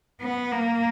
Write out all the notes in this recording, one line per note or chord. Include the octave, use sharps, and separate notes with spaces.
B3
A#3